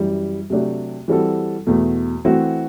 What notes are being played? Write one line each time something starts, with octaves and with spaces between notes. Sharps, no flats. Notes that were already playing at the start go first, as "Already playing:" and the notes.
Already playing: F#2 E3 G3
C3 F#3 A3 D4 G4
E3 G3 C4 F#4 A4
E2 B2 A3
E3 A3 C4 F#4